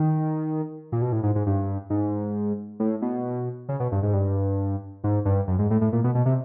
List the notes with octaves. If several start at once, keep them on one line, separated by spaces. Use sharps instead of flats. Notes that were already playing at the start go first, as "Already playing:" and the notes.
Already playing: D#3
A#2
B2
A2
G#2
G#2
G2
G#2
A2
B2
C#3
B2
G2
G#2
G2
G#2
G2
F#2
G#2
A2
A2
A#2
B2
B2
C3